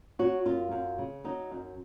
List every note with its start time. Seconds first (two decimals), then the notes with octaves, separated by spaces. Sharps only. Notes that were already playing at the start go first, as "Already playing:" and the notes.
0.19 F#3 F#4
0.45 F#2 F4
0.71 F#2
0.98 C#3
1.24 F#3 D#4
1.51 F#2